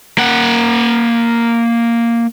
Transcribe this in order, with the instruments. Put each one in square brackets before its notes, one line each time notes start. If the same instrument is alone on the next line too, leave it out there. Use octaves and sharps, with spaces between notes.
[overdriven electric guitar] A#3 F#5